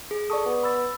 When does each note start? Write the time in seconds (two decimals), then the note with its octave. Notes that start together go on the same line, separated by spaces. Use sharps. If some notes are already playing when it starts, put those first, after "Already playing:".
0.11 G#4
0.30 A4 D5 C#6 D#6
0.46 B3
0.63 B5 E6 A6